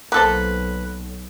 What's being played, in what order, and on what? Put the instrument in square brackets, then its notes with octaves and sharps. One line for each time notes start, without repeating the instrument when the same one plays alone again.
[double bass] B1 [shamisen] A#3 A4 C5 [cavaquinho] B4